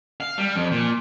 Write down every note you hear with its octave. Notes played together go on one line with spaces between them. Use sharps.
F5
G3
F2
A#2